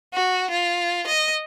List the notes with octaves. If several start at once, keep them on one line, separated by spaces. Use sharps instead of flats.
F#4
F4
D#5